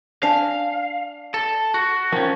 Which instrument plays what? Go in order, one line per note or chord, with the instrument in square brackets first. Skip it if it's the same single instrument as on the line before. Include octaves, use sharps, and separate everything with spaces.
[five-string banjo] D4 G#5 A5 [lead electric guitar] F5
[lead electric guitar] A4
F#4
[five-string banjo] D#3 [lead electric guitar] F3 C#4